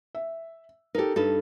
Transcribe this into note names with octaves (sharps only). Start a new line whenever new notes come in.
E5
D#4 G4 A4 A#4
G2 D#4 A4 B4